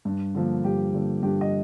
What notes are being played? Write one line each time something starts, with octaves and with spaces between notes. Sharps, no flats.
G2
D3 F3 A#3
G2 G4
D3 F3 A#3
G2 G4
D#5